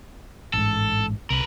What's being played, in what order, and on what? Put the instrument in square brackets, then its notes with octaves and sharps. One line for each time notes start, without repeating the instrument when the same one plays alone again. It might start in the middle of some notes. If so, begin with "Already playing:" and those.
[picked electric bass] A1 G#2 [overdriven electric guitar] A4
[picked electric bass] C2 [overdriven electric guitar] A#4 B4